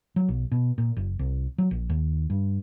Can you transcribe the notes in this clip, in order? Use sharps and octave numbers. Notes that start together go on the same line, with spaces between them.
F#3
B1
B2
A#2
F#1
C2
F#3
A#1
D#2
G2